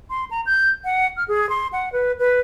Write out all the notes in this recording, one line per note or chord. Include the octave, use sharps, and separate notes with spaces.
C6
A#5
G6
F#5
F6
G#4
C6
F#5
B4
B4